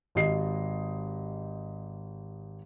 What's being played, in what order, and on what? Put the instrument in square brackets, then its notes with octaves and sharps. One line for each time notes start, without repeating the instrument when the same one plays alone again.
[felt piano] G#1 G4 D#5 C7